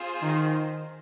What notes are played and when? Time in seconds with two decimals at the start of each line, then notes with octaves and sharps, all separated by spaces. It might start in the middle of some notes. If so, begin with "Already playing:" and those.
Already playing: C4 F4 G#4 C5
0.21 D#3